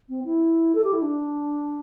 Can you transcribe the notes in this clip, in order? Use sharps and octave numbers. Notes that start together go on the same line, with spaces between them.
C4
E4
A4
G4
E4
D4